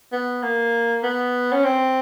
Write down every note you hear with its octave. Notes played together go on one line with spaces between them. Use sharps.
B3
A#3
B3
C#4
C4